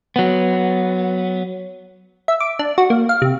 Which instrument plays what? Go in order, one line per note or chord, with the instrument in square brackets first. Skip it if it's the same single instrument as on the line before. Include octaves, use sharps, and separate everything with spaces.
[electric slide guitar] F#3 B3
[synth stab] E5
D6
D4
F#4
A#3
F5
C3